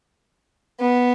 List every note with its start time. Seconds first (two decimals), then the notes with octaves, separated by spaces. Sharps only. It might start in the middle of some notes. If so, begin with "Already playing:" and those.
0.80 B3